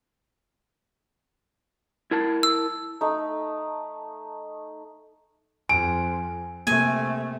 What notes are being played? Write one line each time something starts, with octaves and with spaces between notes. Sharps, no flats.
E4 A#4 A5
E6
A3 D#4
F2 G#5 D7
C3 A3 A#3 G#5